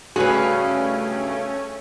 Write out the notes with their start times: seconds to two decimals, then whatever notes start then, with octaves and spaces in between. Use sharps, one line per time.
0.16 G2 C#3 A3 C#4 F#4 G#4 B4 G#5